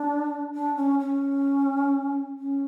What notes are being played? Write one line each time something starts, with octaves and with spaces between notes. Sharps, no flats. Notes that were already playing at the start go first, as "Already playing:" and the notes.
Already playing: D4
D4
C#4
C#4
C#4